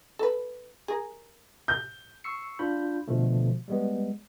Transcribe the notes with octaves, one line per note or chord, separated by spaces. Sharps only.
A4 B4
G#4 A#4
G6
C#6 E6 C7 C#7
D4 F4 B5 G6
B2 D3 F3 A3
G3 G#3 B3